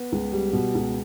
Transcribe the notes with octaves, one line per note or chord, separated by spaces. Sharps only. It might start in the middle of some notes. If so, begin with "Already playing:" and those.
Already playing: B3
C#2
G3
B2
C#2